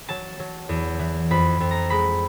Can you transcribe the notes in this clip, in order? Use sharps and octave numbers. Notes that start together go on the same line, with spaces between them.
F#3 A5
F#3
E2
E3
F2 B5
F2
A#5
G#3 B5